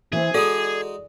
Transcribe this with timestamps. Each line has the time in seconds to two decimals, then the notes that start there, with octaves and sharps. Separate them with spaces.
0.13 E3 C4 G#4
0.34 G#3 D#4 F#4 A4 D5